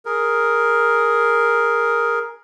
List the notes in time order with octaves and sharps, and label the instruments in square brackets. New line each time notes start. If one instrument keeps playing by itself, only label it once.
[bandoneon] G#4 A#4